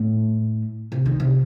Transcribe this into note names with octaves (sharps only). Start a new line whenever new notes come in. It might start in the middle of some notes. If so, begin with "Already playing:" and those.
Already playing: A2
C3
D#3
C3